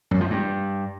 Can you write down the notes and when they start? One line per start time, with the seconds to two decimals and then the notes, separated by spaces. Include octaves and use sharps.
0.11 F#2
0.21 F3
0.30 G2